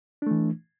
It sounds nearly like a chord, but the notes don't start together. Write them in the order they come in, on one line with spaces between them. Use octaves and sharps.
D4 A3 E3